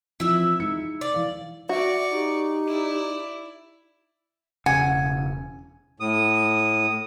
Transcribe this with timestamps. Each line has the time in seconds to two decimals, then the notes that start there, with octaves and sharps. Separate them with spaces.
0.20 E3 F3 C4 E4 E5
0.60 G#3 D#4 C#7
1.01 D5
1.14 E3 F5
1.69 F#4 D5 E5 C#6
2.12 D#4 G4
2.68 E4 D5
4.66 E1 C#3 F#5 G#5
6.00 A2 D#6